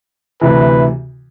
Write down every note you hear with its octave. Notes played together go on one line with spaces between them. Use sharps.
D2 C3 E3 B4